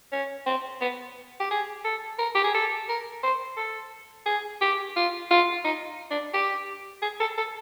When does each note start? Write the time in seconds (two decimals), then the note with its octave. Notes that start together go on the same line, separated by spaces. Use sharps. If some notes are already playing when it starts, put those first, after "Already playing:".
0.12 C#4
0.46 C4
0.81 B3
1.40 G4
1.51 G#4
1.85 A4
2.19 A#4
2.35 G4
2.44 G#4
2.54 A4
2.89 A#4
3.23 C5
3.57 A4
4.26 G#4
4.61 G4
4.96 F4
5.30 F4
5.65 D#4
6.11 D4
6.34 G4
7.02 G#4
7.20 A4
7.38 A4